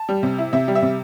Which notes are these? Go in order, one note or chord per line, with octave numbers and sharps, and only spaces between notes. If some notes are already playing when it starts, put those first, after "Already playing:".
Already playing: A5
G3
C3
E4
C3 E5
G3
E5
C3